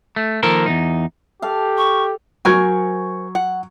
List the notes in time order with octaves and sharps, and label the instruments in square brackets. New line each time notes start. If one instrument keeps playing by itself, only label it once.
[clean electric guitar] A3
D#3 F3 A#3 A4 A#4
E2 G2 D#4
[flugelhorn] G4 [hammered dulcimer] A4 F5
[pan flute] C#6
[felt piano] F#3 C#6 G#6 [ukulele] A#4 C5 G#5
[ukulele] F#5